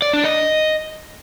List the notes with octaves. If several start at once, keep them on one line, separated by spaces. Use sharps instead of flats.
D5
D4
D#5